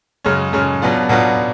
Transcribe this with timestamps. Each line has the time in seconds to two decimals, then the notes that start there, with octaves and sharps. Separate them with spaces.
0.24 F#2 C#3 G#3 C#4
0.53 F#2 C#3 G#3 C#4
0.82 B2 F#3 B3 D4 F4
1.09 B2 F#3 B3 D4 F4